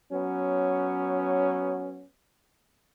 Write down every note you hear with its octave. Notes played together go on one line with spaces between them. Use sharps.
F#3 B3 C#4